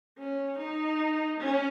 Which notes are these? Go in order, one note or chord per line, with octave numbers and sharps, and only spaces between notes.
C#4
D#4
C#4